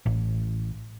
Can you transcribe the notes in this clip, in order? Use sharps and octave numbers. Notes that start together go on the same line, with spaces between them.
A1